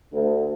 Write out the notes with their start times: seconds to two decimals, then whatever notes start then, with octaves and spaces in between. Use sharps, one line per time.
0.13 D2